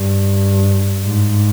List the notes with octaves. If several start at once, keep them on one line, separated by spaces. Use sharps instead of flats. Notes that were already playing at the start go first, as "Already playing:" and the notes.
Already playing: G2
G#2